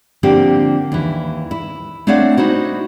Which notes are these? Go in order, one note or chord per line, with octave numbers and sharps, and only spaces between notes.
D3 F3 A#3 C4 G4
D#2 E3
E4
A3 C4 D4 C#5 F5 F#5
D#4 E4 F#4 C5